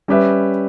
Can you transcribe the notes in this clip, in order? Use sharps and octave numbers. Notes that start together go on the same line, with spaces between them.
G3 C#4 G4 B4 E5